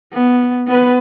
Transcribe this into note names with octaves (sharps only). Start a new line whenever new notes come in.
B3
B3 B4